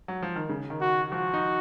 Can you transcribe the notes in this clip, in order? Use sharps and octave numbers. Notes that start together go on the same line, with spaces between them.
F#3
F3
D#3
C#3
D#3
F#4
F3 F#4
D#4